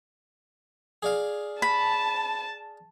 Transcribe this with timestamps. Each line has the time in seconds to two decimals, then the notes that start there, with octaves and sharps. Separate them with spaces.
1.03 G#4 D5 F5
1.62 A5 B5